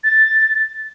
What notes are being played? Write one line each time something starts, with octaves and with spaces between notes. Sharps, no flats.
A6